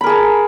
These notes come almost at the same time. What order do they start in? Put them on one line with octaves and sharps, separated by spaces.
B5 A#4 G#4 A5